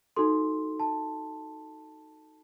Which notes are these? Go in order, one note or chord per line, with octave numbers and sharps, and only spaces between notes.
D#4 F#4 A4 C6
A5